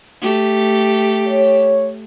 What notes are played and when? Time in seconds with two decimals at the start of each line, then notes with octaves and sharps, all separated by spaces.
0.22 A3 G4
1.27 C#5